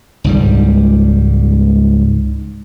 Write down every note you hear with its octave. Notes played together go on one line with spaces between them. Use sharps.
C#2 G#2 G3